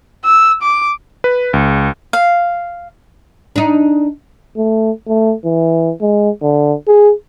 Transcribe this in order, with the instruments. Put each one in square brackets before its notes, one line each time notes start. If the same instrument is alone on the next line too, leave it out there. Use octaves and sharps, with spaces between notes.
[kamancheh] E6
D6
[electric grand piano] B4
C#2
[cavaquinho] F5
[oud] D4 D#4
[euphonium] A3
A3
E3
G#3
D3
G#4